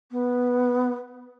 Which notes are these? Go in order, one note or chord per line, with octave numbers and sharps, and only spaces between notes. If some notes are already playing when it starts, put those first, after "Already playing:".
B3